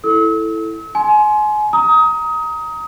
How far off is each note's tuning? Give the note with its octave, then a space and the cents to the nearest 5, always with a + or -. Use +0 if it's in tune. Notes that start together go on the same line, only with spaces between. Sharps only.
E4 +0 A4 +0 E6 -40
G#5 +30 C6 +0
A#5 +0 D#6 +25